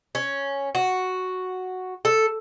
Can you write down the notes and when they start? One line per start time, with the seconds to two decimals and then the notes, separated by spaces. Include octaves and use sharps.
0.15 C#4
0.75 F#4
2.05 A4